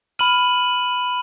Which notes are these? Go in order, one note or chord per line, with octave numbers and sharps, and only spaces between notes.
B5 F6 D#7 F#7